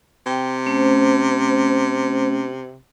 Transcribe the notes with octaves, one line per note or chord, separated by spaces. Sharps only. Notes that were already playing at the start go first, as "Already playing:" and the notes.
C3 G5
A3 C#4 C5